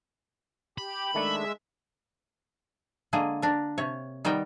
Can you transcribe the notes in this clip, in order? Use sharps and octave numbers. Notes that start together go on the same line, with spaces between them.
G4 B5
D#3 G#3 A3 D4 E5
D3 G#3 A#3 G#4
D4 A#4
C3 C#5
D#3 G3 B3 A#4 G5